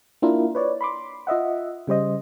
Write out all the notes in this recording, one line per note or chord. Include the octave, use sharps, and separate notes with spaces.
A#3 D4 E4 F4 A#4
B4 C#5 D5
B5 C6 D6
F4 D#5 E5 F#5
C#3 G3 C5 D#5